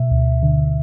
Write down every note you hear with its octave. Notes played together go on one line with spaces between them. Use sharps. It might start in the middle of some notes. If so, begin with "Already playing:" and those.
Already playing: B2 E5
D2
D3